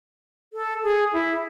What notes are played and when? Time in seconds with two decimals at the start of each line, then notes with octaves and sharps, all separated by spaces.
0.53 A4
0.83 G#4
1.13 E4